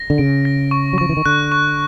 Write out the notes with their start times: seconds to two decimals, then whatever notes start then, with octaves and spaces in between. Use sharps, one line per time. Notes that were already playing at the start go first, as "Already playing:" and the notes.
Already playing: A#6
0.10 D3
0.18 C#3 D7
0.45 A#6
0.71 C#6
0.93 F#3
0.98 F3 C#6
1.09 E3
1.17 D#3
1.26 D3 F#6
1.52 C#6